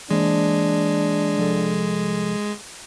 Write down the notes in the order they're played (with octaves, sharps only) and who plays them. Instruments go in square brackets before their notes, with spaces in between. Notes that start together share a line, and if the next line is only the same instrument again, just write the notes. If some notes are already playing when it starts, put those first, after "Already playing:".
[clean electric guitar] E3 A#3 C5 [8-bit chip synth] G#3 [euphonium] D4
[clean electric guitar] C2 F3 A4